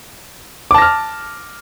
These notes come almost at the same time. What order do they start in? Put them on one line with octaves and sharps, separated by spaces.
D6 A5 A#6 F6